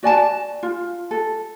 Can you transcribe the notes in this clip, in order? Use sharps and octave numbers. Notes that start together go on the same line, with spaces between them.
F#4 D5 G#5 A5
F4
A4